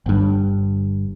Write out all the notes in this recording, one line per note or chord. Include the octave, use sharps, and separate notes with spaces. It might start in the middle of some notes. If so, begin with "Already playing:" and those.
G1 G2